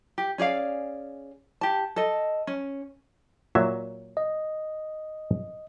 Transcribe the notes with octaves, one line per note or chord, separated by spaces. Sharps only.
G4
C#4 G#4 D5 F5
G4 A5
A4 D#5
C#4
A#2 F#3 E5
D#5